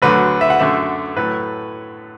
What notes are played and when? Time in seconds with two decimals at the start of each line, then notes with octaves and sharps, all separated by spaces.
0.02 D2 D3 F#3 A3 B4
0.41 E5
0.50 F#5
0.59 F#2 D3 A3 E5
1.17 A2 F#3 A3 B4